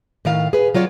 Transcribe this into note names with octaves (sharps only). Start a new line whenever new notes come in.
A2 D#3 F5
G#4 B4
F#3 F4 C#5 D5